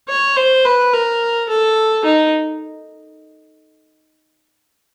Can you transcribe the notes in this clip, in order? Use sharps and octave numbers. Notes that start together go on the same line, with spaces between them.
C#5
C5
B4
A#4
A4
D#4